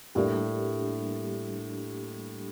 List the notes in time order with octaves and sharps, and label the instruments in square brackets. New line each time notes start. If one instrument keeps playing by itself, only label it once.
[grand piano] A2 [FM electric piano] G3 A#3 D4 G4